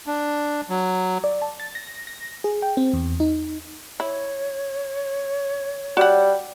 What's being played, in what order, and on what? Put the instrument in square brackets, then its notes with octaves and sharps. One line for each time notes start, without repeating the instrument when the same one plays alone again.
[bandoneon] D4
F#3
[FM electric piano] D5
A5
A6
A#6
A#6
G#4
G5
C4
E2
D#4
[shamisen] E4 [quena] C#5
[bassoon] G3 [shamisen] F#4 F#5